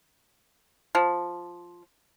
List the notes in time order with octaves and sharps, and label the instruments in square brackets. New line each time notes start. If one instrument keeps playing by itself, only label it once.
[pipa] F3